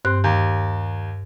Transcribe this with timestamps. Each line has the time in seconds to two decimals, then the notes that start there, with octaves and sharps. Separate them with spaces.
0.05 G2 C4 F#6
0.24 D#2